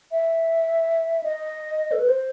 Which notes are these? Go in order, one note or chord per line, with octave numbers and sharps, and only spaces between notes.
E5
D#5
A4
B4
C5